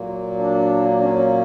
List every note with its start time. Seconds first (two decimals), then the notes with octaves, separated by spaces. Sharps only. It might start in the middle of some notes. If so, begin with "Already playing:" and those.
Already playing: A#2 F#3 A#3
0.38 D4
1.00 D4
1.04 C#4